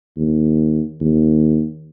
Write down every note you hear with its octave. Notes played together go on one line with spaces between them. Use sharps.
D#2
D#2